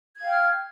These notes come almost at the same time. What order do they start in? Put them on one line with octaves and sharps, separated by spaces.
G#6 F5 G5 F6